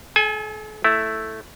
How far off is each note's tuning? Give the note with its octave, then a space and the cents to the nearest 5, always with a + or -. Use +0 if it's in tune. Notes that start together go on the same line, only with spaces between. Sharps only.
A4 -45 G#5 +0
A3 +0 E4 +0